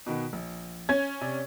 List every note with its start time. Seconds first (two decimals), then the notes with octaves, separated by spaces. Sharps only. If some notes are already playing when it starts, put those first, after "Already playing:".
0.06 B2 D#3 B3
0.33 A#1
0.89 C#4 G#6
1.21 C3 D5